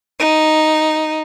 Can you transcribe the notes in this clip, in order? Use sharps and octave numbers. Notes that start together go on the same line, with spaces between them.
D#4